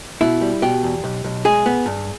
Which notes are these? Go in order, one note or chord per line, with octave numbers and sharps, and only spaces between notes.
B2 E4
G3
B2 G4
E2
B1
B1
G#3 G#4
B3
G2